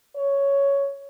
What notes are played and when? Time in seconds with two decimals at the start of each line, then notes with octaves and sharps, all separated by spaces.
0.16 C#5